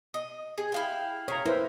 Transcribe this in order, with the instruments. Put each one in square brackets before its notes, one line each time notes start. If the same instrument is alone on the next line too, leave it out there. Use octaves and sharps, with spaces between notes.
[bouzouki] D#5
G#4
E4 F5 G5
[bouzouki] C#3 [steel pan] C#5 A#5
[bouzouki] A#3 [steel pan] E4 B4 C5